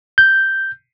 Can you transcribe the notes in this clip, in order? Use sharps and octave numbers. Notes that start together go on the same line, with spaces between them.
G6